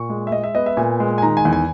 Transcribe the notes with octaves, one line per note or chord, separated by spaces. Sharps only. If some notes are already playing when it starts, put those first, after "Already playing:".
Already playing: A#2 C#6
G#3
E5
G#3 D#5
E5
B3 D#5
E5
A#2 G#5
G#3
G#5
D#3 A#5
G#5
E2
G#5